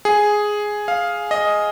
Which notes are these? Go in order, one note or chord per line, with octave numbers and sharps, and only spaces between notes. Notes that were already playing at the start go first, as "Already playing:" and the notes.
G#4
F5
D#5